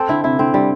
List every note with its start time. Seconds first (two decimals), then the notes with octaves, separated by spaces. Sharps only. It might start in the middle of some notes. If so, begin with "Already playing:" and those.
Already playing: C4 A4
0.09 D3 E4
0.24 C3 E4
0.39 D3 C4
0.54 D3 G3